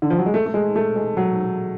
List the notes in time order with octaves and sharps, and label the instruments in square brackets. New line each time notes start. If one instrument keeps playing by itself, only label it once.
[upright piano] D3
F3
F#3
G#3
A3
A3
G#3
A3
G#3
F#3